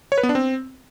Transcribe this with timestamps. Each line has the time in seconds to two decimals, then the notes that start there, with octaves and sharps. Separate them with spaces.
0.12 C#5
0.18 B4
0.23 B3
0.29 D4
0.35 C4